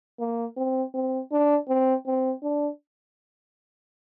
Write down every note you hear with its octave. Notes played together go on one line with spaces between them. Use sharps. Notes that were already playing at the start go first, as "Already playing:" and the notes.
A#3
C4
C4
D4
C4
C4
D4